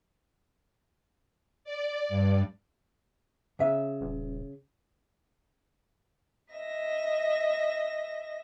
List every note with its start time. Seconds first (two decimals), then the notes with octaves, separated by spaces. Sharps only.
1.64 D5
2.08 G2
3.59 C#3 E5
4.01 D#1
6.53 D#5 E5 A#6